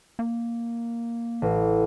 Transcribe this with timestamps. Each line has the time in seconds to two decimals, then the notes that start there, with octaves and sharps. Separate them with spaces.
0.19 A#3
1.42 A1